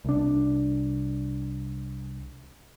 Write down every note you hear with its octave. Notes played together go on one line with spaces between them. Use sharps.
C2 D4